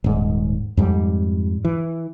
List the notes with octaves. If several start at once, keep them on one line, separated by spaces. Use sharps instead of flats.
D#1 G#2
F2 G#2 G3
E3